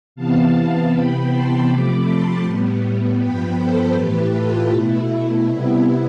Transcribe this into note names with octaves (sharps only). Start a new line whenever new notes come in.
C3 E3 B3 F5 A5
C3 E3 B3 G5 B5
A5 C6
C3 F3 A3 B5 D6
A5 C6
A2 G3 B3
G2 F3 B3 G5 B5
A4 C5
A2 E3 A3 G4 B4
F4 A4
B2 A3 E4
C3 G3 B3 E4